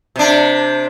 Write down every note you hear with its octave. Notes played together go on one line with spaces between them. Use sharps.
C3 D4